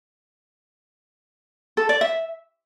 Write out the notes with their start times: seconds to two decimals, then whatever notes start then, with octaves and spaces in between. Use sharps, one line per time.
1.77 A4
1.89 D5
2.01 E5